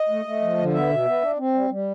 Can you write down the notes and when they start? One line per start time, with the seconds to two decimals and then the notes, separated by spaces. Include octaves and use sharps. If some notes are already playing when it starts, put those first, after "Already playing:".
Already playing: D#5
0.09 A3
0.25 A3
0.41 F3
0.58 D3
0.74 B3 E5
0.90 B2
1.06 B3
1.22 D4
1.38 C4
1.54 G3
1.70 G3